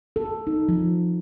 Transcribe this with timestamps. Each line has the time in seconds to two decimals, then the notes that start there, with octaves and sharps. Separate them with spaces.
0.16 A4
0.47 D#4
0.69 F3